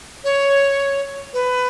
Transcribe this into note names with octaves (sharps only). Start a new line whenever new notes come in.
C#5
B4